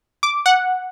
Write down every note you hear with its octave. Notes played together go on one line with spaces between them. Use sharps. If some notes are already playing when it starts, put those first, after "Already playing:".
D6
F#5